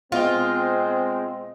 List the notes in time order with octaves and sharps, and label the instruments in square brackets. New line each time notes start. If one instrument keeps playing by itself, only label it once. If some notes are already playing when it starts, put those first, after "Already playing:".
[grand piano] B2 D#5 G5 [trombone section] G#3 C4 [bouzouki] F4